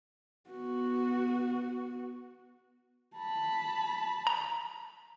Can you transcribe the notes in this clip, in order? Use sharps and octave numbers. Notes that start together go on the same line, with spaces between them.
B3 F#4
A5 B5
A#5